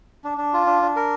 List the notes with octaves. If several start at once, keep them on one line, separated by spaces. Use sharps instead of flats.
D4
D4
F4
D4
D4
A#4